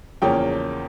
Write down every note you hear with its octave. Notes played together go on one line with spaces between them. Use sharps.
E2 C#3 F3 A#3 C#4 G5